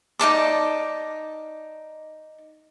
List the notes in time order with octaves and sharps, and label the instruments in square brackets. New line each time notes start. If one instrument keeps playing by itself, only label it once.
[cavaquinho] D#4 D5 A5 D6